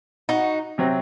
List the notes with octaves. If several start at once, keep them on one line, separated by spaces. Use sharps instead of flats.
D#4 F#4
C3 F#3 C4